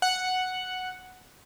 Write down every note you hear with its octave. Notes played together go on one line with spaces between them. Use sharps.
F#5